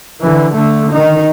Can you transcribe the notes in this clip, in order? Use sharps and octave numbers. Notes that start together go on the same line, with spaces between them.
D3 E3
D3 A3
D#3 D#4